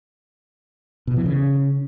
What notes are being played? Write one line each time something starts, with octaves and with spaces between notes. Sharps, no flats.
B2
E3
C#3